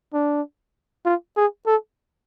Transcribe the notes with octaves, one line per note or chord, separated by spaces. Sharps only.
D4
F4
G#4
A4